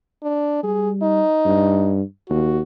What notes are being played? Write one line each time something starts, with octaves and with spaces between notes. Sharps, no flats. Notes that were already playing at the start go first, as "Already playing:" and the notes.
D4
G3 G#4
D#4
G2
D#2 F#4